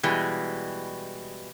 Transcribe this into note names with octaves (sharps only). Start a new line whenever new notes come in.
B2 E3 G3 G#3